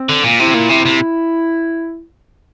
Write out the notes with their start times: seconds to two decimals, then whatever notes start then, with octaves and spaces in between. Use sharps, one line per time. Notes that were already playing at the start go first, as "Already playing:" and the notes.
Already playing: C4
0.09 D3
0.24 A#2
0.39 C3 E4
0.54 A#2
0.69 C3
0.85 C3